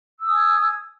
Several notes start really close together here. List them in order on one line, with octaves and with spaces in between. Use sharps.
E6 D#6 G#5 G#6